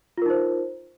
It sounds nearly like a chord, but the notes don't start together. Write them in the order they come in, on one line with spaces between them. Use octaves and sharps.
F4 A#4 D#4 C5